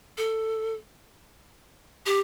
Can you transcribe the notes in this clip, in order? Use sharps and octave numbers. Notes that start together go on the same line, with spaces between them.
A4
G4